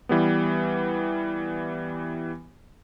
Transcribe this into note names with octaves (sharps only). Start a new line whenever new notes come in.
E3 G3 B3